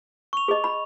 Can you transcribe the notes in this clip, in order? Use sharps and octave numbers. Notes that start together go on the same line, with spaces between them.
C#6 F7
G#4 D#5
B5